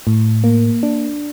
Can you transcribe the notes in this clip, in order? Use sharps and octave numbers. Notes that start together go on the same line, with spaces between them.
A2
A#3
D4